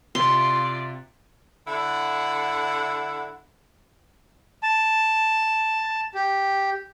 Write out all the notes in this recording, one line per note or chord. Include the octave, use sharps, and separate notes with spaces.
C3 F4 D5 C6
D3 E4 F#5
A5
G4